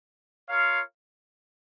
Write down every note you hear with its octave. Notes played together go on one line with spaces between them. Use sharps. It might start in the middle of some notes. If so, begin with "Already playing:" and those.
F4 A#4 C#5 F5